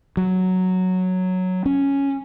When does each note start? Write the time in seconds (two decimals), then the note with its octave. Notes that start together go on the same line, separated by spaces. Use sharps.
0.17 F#3
1.66 C#4